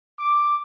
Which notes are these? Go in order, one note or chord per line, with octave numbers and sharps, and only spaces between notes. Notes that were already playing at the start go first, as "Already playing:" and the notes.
D6